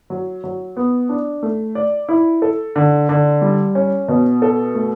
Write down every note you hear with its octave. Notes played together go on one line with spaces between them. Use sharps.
F#3
F#3
B3
D4
A3
D5
E4
A4
D3
D3
G3
C#4
B2
A4
A3